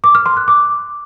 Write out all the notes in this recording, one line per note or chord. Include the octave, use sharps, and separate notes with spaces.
D6
F6
C6
F#6
D6